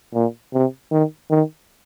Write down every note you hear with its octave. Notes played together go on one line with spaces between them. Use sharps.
A#2
C3
D#3
D#3